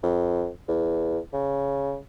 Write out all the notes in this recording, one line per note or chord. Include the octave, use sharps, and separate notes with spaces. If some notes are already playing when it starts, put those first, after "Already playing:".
F2
E2
C#3